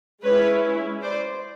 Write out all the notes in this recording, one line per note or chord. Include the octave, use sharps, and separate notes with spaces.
G#3 C#4 E4 B4 C#5
C5 D5